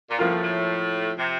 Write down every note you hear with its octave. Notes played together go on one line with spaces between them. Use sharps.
A#2
A2 F3 A#3 F4 A#4
A2
C3